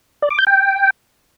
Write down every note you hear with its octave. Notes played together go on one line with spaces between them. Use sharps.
D5
D6
G6
G5